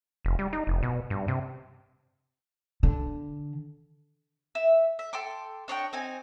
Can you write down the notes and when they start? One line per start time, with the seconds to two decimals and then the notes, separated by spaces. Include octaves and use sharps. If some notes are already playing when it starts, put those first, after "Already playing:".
0.25 F1
0.39 G3
0.53 D#4
0.67 F1
0.83 B2
1.10 G2
1.28 C3
2.83 D3
4.55 E5
4.99 E5
5.13 A4 G5 C6 D6
5.68 D4 C#5 D#5 G5
5.93 C4 D#4 G#5